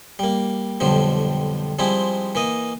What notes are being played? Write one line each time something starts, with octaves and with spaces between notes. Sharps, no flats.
G3 A#3
B1 F2 D3 F3 G3
F3 G3 G#3 C4 E4
E3 A#3 D#5